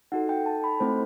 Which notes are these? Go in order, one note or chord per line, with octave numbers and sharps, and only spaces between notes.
D#4 F#4 A4 F#5
G5
A5
B5
A3 C4 E4 A4 C5